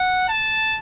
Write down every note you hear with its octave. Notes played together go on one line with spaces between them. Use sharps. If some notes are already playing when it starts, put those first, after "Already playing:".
Already playing: F#5
A5